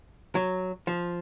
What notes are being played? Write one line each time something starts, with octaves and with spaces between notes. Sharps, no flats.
F#3
F3